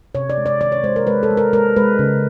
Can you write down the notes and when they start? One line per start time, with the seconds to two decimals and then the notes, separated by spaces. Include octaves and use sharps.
0.15 C3 C#5
0.30 D5
0.38 G#3
0.46 D5
0.60 D#3 D5
0.72 C#5
0.84 G#3 C5
0.96 A#4
1.07 G#3 B4
1.23 A4
1.30 G#3
1.37 A#4
1.53 G#3 A#4
1.76 G#3 B4
1.99 C#3